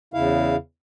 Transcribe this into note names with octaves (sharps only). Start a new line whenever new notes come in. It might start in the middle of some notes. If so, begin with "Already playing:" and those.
E2 C#3 E4 F5